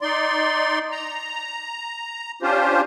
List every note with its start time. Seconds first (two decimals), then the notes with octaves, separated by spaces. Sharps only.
0.01 D#4 D5 C6
0.91 A#5
2.42 C#4 D4 F4 G4 C5